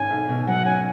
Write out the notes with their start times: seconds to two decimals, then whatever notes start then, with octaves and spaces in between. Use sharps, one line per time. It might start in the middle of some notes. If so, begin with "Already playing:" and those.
Already playing: G#1 C#4 G#5
0.10 B1
0.29 B2
0.47 F#3 F#5
0.65 C#4 G#5